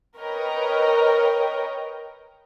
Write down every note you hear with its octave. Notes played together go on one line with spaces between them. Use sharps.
A#4 B4 C#5 D#5 G5 A#5